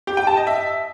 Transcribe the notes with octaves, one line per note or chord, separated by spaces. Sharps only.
G4
G5
A5
D#5
E5